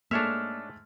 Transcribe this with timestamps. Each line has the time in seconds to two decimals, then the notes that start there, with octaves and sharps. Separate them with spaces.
0.11 G#2 A3 A#3 D4 C#5 E5 F6